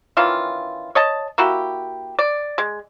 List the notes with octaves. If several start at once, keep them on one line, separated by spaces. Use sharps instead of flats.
D#3 E3 C#4 F4
C#5 D#5 A5
A#3 E4 F#4 G4
D5
G#3